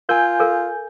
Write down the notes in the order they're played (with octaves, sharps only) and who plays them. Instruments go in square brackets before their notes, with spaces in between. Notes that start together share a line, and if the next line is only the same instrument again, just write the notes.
[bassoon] F4 [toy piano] A#4 [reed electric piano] G#5 G6
[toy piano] A4 A#4 F5